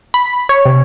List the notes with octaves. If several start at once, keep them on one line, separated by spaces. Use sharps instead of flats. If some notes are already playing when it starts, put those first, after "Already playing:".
B5
C#5
C3